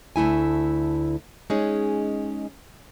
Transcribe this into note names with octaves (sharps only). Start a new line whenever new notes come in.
D2 A3 E4 G#5
G#3 C#4 D#4 G#4